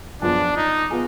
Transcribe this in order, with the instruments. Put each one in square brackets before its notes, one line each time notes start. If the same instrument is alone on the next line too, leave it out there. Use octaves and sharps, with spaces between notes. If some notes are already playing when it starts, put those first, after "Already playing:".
[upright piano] F#2 F3 B3 F4 G#4 [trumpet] D4
[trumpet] D#4
[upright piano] B3 F4 G#4